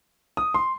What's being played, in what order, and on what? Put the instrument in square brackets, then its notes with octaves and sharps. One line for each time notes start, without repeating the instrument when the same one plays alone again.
[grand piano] D#6
C6